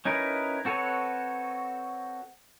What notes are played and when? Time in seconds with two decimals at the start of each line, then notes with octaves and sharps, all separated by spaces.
0.05 C#4 D#4 E4 A#4 B4
0.65 C4 F#4 A4 B4 C#5